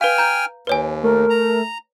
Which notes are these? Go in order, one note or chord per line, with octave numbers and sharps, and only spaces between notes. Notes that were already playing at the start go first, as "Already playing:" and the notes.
B4 F5 G5 G#5 F6
A#5 G6
D#2 B4 C#5 G#5
A3 A#4
A#5